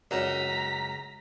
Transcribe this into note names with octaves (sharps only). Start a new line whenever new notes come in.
C#2 F#2 A#5 B6